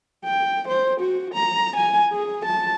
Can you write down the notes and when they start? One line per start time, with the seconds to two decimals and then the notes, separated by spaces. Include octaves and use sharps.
0.25 G5
0.68 C5
1.00 F#4
1.34 A#5
1.76 G#5
2.12 G#4
2.45 A5